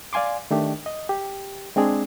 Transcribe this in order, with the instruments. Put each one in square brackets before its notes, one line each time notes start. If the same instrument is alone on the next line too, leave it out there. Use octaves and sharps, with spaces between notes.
[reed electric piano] D5 F5 G#5 C6 D6
D#3 A3 D4 G4
D#5
G4
G#3 C4 D4 G#4